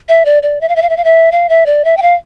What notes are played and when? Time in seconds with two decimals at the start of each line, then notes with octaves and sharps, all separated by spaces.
0.09 E5
0.25 D5
0.43 D5
0.61 E5
0.69 F5
0.76 E5
0.82 F5
0.89 E5
0.97 F5
1.04 E5
1.32 F5
1.49 E5
1.66 D5
1.85 E5
1.97 G5
2.02 F5